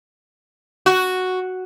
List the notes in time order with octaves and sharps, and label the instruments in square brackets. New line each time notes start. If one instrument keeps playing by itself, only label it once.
[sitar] F#4